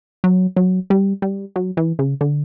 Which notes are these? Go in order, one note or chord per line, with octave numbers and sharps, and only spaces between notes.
F#3
F#3
G3
G3
F#3
E3
C#3
D3